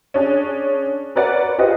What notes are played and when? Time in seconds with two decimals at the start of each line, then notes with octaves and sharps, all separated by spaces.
0.14 C#4 D4 G#4
1.15 F#4 A#4 B4 C#5 D5 F#5
1.58 F4 G4 G#4 B4 C5 D#5